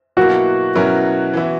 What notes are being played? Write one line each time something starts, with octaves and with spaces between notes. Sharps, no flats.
B2 F#3 A#3 E4 F#4
B2 F#3 C#4 E4 A#4
E3 B3 E4